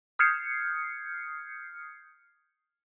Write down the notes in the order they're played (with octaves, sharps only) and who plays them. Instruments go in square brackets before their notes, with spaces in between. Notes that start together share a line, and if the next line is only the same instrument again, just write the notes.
[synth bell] D#6 F6 G6 G#6 C7 C#7